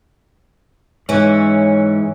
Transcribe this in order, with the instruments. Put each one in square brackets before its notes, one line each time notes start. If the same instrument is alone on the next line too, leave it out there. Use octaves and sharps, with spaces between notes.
[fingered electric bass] G#2 [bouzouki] E3 C#4